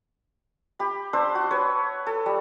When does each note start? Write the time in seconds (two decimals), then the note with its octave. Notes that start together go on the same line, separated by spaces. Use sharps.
0.79 G4 B5
1.13 D4 C5 E6
1.35 F#4
1.51 B4 C#5
2.07 A4
2.26 G3